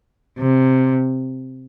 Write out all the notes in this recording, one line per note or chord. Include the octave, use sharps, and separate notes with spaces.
C3